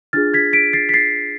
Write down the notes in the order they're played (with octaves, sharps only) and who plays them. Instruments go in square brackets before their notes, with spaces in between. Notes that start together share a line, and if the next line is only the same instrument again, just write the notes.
[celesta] D4 F4 G#4 F6 A6
G#6 B6
B6 D7
A6 C7
B6
A6 C7